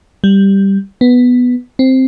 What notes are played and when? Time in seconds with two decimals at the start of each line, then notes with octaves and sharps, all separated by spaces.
0.24 G3
1.01 B3
1.79 C4